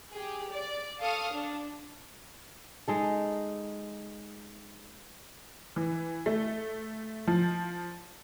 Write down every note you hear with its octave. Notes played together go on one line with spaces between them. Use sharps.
G4 G#4
D5
A4 F5 A5 C#6 D#6 F6
D4
G#3 D#4 A4
E3
A3
F3